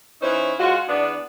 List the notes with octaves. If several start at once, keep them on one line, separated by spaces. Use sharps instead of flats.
E3 C#4 D#4 C5
G#3 F4 F#4
E2 B3 D4